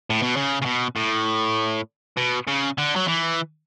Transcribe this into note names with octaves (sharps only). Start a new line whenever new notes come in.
A2
B2
C#3
C#3
B2
A2
B2
C#3
D3
F#3
E3